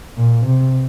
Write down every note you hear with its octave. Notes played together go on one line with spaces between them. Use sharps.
A#2
C3